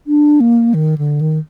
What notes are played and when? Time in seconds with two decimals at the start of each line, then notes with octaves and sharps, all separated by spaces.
0.07 D4
0.40 A#3
0.74 D#3
0.98 D3
1.21 D#3